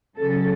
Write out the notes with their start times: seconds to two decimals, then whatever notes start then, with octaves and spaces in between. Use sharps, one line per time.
0.16 C#3 F#3 C#4 A4